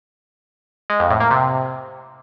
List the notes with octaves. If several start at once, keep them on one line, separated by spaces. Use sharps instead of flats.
G#3
F2
A2
A#3
C3